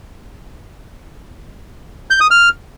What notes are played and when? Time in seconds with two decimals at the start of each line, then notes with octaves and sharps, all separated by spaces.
2.10 G6
2.21 D#6
2.31 F6